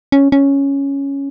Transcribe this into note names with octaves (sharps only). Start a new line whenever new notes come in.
C#4
C#4